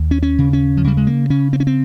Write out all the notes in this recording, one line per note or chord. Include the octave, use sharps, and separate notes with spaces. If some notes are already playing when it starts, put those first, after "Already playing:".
Already playing: D#2
C#4
C#4
C#3
C#4
F3
C#3 G3
G#3
A#3
C#3 C#4
C4
C#4
C4